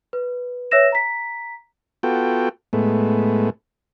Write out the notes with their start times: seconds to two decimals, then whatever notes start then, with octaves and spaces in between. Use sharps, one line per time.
0.13 B4
0.71 B4 C#5 E5 E6 A#6 E7
0.92 A#5 B6
2.03 B3 F4 F#4 A4 G5
2.73 A2 G#3 A3 B3